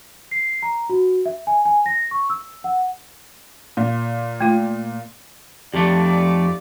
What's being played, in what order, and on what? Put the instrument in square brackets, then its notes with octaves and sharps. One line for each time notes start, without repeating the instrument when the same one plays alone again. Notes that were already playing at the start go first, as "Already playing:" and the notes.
[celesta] C7
A#5
F#4
E5
G#5
G#5
A#6
C#6
E6
F#5
[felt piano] A#2
[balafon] A3 F4
[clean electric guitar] F2 A3 [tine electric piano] F3 G4 [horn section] D#4 F4 D5